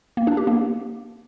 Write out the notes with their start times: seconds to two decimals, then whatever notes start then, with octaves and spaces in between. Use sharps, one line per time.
0.17 A#3
0.27 D4
0.37 G4
0.47 A#3